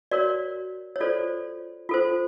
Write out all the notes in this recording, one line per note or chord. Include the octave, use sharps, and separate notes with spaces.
F#4 A#4 C#5 D5
C#5
F4 A4 C5 D5
F4 A4 C5